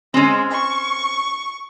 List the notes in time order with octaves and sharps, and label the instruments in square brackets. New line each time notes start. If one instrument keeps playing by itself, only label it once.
[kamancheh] G#3 [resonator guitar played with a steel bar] C4 C#4
[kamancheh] C#6